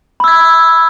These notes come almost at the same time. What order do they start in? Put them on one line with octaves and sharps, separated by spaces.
B5 E6 G#6